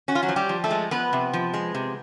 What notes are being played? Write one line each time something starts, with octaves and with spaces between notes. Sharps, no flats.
C#4 F#4
F4
F#3 F#4
F3
G3 G4
F3
A3 A4
G#3
F3 B3 B4
C3
F3
G#3
C3